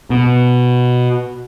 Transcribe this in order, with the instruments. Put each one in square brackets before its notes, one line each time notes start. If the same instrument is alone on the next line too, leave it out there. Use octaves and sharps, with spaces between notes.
[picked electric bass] B2